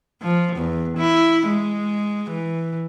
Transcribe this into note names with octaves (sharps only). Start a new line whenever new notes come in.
F3
E2
E4
G#3
E3